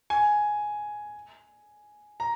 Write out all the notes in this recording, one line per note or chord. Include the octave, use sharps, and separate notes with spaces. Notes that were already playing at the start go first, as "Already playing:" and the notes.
G#5
A#5